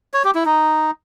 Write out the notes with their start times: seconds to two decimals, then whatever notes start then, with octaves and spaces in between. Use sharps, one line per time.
0.14 C#5
0.24 G4
0.35 E4
0.46 D#4